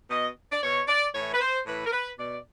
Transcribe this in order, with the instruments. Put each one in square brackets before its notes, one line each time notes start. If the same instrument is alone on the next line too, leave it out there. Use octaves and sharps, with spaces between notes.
[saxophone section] B2 D#5
D5
B2 C#5
D5
A2 E3 C#5
B4
C5
A2 E3 B4
A#4
B4
B2 D5